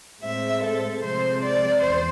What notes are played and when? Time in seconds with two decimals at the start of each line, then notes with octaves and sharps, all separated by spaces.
0.22 A2 G#3 C4 E5
0.62 A4
1.01 C3 F3 G#3 C4 C5
1.41 D5
1.81 E2 C5